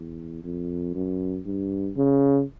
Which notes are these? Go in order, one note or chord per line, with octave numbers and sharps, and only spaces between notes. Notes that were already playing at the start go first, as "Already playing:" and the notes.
Already playing: E2
F2
F#2
G2
C#3